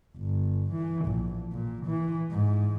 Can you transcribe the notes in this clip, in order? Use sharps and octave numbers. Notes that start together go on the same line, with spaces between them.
G1
E3
A#1
A#2
E3
G#2